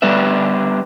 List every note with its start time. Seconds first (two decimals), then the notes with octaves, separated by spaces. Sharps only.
0.02 G3 B3 D4 G4 B4 E5